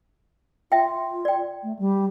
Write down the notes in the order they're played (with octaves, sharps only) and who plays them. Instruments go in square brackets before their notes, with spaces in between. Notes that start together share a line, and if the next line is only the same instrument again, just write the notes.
[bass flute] F4 [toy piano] E5 G5
[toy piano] D5 G5
[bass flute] A3
G3